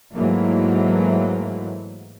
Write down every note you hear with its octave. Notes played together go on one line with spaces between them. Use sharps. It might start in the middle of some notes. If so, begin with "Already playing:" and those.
G#2 E3 F#3 A3 A#3